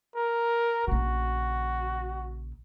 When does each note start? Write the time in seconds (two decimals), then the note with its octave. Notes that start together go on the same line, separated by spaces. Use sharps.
0.16 A#4
0.87 A#1 C#3 F#4